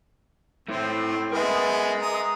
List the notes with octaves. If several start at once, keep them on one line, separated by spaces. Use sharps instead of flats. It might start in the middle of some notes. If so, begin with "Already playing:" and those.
A3 C4 E4
G#3 B3 A#4 E5
G#3 A#5 D#6